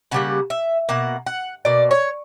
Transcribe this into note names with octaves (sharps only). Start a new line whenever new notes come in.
C#3 G3 A#3 F#5
E5
B2 A#3 F#5
F#5
B2 A#3 D5
C#5